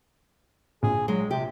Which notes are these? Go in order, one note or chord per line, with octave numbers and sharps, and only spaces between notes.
A#1 G#4
F#3 G#3
C3 G4